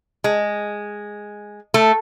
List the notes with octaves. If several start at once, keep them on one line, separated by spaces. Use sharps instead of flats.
G#3
A3